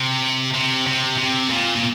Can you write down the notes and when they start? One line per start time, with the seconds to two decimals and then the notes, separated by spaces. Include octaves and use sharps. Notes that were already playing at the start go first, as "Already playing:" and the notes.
Already playing: C3
0.54 C3
0.87 C3
1.18 C3
1.50 A#2
1.76 A#2